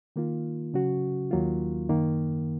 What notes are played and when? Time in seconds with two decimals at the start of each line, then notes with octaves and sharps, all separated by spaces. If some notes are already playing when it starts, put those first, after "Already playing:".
0.16 D#3 A#3 F4
0.74 C#3 F#3 C#4 F#4
1.31 D#2 D#3 F#3 A#3 F4
1.89 F#2 D#3 A#3